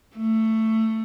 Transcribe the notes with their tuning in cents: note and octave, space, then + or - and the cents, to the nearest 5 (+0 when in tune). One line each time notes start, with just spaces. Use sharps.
A3 +15